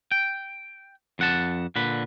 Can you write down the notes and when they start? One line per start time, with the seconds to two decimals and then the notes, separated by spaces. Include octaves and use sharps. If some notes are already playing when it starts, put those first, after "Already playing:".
0.12 G5
1.19 F2 F#5 A5
1.76 A#2 D3 B4